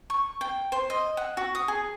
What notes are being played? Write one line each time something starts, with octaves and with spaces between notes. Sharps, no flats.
C#6
G5
C5
D#5
F#5
F#4
D#6
G#4